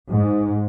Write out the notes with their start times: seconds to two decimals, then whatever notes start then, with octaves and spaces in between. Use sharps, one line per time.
0.10 G#2